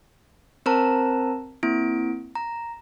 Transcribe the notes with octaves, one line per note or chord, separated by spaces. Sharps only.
C4 A#4 C5 A5 A#5
A#3 C4 E4 D7
A#5